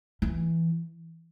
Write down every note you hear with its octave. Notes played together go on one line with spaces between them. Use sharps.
E3